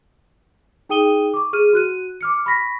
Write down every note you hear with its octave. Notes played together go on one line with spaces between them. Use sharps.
D#4 G#4 G5 D#6 D#7 G7
C#6 D6
G#4 F6 D#7
F#4 F#6 D#7
D6 F6 C#7
B5 C#6 A#6 B6